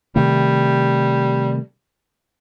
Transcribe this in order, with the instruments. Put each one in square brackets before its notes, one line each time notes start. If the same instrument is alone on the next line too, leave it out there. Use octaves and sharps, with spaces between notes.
[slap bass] C3 D#3 A3 [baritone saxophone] G3